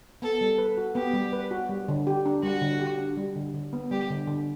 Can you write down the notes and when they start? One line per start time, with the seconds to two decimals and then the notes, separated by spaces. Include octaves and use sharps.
0.22 B3 A4
0.41 G3
0.58 B4
0.77 F#4
0.95 B3 G4
1.14 G3
1.33 B4
1.51 F#4
1.69 G3
1.88 D3
2.07 G4
2.26 D4
2.43 G3 F#4
2.62 D3
2.80 G4
2.99 D4
3.17 G3
3.36 D3
3.54 D3
3.73 B3
3.91 G3 G4
4.10 D3
4.27 D3